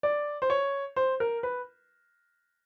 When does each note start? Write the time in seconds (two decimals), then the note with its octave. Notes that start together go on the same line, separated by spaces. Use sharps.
0.03 D5
0.42 C5
0.50 C#5
0.96 C5
1.20 A#4
1.43 B4